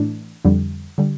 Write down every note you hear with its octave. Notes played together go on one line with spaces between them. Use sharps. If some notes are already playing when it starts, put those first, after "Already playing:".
Already playing: A2 E3 A3 D4
F2 D3 G3
D3 G3